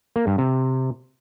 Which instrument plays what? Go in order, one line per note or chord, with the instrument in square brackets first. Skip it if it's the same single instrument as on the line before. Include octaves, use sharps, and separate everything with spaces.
[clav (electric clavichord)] A#3
G2
C3